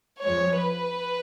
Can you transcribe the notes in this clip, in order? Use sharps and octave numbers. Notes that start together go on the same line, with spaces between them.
F2 F3 G#3 C#5
B4